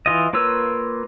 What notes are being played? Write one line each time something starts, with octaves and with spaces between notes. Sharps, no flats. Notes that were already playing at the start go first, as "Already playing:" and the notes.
E3 F4 D#5
A#3 F4 B4 C#5 E6